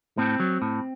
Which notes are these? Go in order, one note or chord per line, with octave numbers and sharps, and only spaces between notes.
A2 C4
F#3
A2